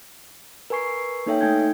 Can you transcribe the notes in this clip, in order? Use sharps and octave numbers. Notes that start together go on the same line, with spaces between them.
A#4 B4 G#5 C#6 C7
A#3 D#4 A4 C#5 E5 G5
A3 D#4 G5 G#5 G6 G#6